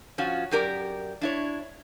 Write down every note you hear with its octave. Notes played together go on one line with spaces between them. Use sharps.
F3 C#4 F4 F#4
F#2 G4 A#4 D5
D4 E4 C#5